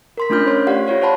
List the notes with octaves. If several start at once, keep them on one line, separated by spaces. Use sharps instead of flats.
A#4 C6 B6
A3 C#4 D4 F4 F6 G6
C5 C#5 C6
G4 D5 F5 F#5
F4 G4 C#5 F#5
C5 C#5 F#5 A5 B5 C6